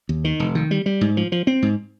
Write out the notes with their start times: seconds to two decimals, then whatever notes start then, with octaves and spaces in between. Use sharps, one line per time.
0.09 D#2
0.24 D#3
0.40 F1
0.55 D#3
0.71 G3
0.86 G3
1.01 G#2
1.17 F3
1.32 F3
1.47 C4
1.62 G#2